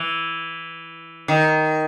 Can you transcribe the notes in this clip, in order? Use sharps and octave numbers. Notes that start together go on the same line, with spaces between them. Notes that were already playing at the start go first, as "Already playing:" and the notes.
Already playing: E3
D#3